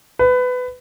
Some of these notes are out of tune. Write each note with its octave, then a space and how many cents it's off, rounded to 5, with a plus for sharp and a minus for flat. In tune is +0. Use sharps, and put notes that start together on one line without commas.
B4 +20